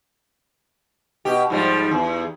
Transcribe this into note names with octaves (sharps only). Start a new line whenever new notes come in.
B2 G4
G#2 F3 G3
E2